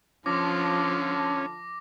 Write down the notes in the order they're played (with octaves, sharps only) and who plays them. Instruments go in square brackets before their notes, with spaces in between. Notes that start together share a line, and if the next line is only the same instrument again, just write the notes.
[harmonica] D3 F4 A5 [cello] F3 [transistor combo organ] C#4 [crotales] D6 A#6